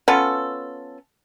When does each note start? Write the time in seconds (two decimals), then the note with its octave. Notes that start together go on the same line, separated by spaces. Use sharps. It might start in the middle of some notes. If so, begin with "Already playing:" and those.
0.08 B3 C#4 F4 A4